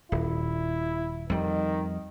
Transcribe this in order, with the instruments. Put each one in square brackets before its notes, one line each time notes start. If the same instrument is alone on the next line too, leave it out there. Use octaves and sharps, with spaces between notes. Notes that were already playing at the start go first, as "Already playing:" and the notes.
[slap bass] D#1 [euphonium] E4
[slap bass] F2 G3 [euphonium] D#3